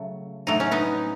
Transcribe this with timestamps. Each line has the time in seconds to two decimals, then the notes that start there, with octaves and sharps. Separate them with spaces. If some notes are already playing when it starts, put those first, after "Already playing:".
Already playing: C#3 F#3 A3
0.47 A2 F#3 A3 D#4
0.60 C#4
0.71 B3 D#4